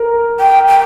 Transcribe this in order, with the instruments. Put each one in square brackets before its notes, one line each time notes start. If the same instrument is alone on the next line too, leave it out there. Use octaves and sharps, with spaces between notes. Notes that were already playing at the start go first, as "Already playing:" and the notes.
Already playing: [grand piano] A#4
[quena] G5
G5